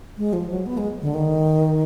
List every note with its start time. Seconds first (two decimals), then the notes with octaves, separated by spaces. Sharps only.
0.18 G#3
0.33 F3
0.50 F#3
0.66 B3
0.77 G#3
1.01 D3
1.14 D#3